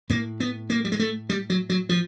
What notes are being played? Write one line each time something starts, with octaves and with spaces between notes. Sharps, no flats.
A2 A#3
B3
A#3
G3
G#3
A3
G3
F#3
F#3
F3